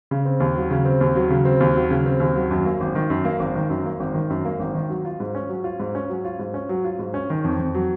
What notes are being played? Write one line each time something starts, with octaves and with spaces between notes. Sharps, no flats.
C#3
C4
D#2
F#3
C#3
C4
D#2
F#3
C#3
C4
D#2
F#3
C#3
C4
D#2
F#3
F#2
A#3
G#1
D#3
F#2
A#3
G#1
D#3
F#2
A#3
G#1
D#3
F#2
A#3
G#1
D#3
F#3
F4
G#2
C#4
F#3
F4
G#2
C#4
F#3
F4
G#2
C#4
F#3
F4
G#2
C#4
D#3
F2
F2
F#3